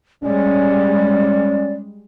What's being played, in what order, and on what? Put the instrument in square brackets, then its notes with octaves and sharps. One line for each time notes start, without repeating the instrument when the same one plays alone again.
[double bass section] G3 G#3 [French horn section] C#4 [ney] D5